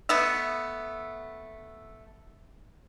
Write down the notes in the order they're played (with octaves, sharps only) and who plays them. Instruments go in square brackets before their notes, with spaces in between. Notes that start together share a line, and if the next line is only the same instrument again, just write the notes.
[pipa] A3 B3 E5